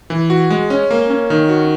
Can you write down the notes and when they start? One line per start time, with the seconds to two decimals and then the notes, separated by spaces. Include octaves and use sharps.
0.10 E3
0.30 F#4
0.50 G#3
0.70 C#4
0.91 A#3
1.10 C#4
1.30 D#3
1.49 F#4